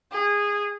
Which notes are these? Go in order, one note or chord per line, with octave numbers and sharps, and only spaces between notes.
G#4